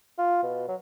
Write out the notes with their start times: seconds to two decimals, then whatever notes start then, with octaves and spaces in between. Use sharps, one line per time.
0.18 F4
0.43 B2
0.68 F#3